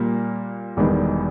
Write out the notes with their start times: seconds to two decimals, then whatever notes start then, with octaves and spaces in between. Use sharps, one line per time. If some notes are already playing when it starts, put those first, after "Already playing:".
Already playing: A#2 G3 A#3
0.77 E1 E2 D#3 G3 B3